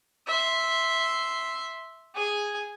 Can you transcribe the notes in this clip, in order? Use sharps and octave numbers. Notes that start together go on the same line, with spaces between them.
E5 C6
G#4 G#5